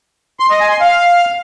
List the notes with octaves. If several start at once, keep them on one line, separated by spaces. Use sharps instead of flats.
C6
D#5
G#5
C6
F5